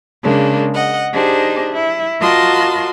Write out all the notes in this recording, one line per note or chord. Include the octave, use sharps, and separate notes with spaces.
C#3 G#3 A#3 D4
D#5 F#5
D4 D#4 G4 G#4 C5
E4
F4 F#4 A#4 D#5 A5 C6